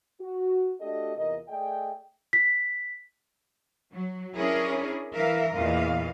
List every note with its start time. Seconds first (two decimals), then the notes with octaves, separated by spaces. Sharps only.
0.20 F#4
0.81 A3 D4 F#4 G4 A4 D#5
1.17 E2 C3 F4 A#4 D#5
1.49 A3 G#4 D5 D#5 G5
2.33 B6
3.92 F#3
4.35 C#4 D4 E4 G#4 A#4 C#5
5.13 E3 A#4 E5 F5
5.53 E2 A#2 E3 D#5 F5